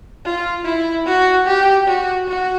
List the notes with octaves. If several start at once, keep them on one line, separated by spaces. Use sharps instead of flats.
F4
E4
F#4
G4
F#4
F#4